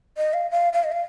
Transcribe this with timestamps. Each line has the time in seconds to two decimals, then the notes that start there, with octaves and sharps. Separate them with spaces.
0.17 D#5
0.34 F5
0.51 F5
0.73 F5
0.84 D#5
0.92 F5